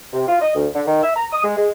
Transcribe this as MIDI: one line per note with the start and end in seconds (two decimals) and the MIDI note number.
0.13 0.23 48
0.28 0.36 65
0.41 0.51 75
0.55 0.67 38
0.74 0.82 50
0.87 0.99 51
1.03 1.14 76
1.16 1.27 82
1.33 1.43 87
1.44 1.53 56
1.57 1.69 56